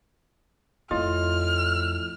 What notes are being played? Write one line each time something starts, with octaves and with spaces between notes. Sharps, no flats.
F2 A2 F4 D#5 F6